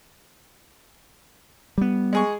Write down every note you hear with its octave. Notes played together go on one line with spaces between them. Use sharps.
G3 B3
G#3 G#4 C#6